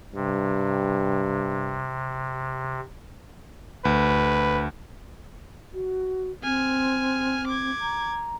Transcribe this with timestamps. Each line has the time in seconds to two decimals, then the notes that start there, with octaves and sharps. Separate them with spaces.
0.15 G2 C3
3.85 D2 B4
5.74 F#4
6.44 C4 G#5 F6
7.47 D6 G#6
7.81 A#5